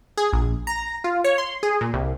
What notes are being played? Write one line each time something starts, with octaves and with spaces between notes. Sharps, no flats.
G#4
A#1
A#5
F4
C#5
C6
G#4
A#2
C2